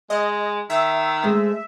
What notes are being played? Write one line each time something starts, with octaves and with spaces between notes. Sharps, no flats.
G#3 D#5
D#3 E5
G#3 A3 C5